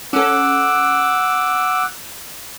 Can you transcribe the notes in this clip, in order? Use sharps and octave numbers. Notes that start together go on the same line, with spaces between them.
C#4 A4 F#5 D6 E6